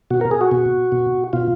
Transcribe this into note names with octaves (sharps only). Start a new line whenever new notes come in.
B2 F#4
A#4
G#4
F#4
B2
B2
B2 F4